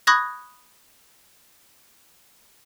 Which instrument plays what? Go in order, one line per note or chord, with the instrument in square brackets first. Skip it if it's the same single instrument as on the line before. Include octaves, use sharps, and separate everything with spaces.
[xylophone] B5 C#6 D#6 F#6 G#6 A#6